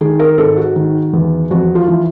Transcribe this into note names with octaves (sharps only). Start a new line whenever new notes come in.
D#3 G#4
A#4
G#2 A4
F#4
D#3
E2
F2 F#4
F4
E3